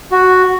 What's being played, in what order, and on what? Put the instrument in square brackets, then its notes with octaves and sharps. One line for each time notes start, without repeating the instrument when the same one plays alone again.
[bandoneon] F#4